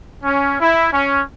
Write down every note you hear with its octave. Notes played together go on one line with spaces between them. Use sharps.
C#4
E4
C#4